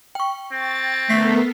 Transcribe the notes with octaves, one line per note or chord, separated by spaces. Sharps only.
G5 C#6
C4 A6
A3 B3 A4 A#4 B6 C7